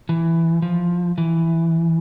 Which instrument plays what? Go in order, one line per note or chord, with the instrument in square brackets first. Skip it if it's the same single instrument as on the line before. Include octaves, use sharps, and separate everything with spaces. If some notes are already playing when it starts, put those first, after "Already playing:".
[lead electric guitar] E3
F3
E3